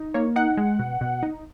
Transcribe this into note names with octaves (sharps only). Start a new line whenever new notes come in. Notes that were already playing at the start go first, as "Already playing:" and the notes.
Already playing: D#4
A#3 C#5
D#4 F#5
G#3
B2
B2
D#4